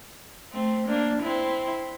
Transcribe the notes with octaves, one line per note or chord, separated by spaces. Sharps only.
A3 C4
A#3 D4
C4 E4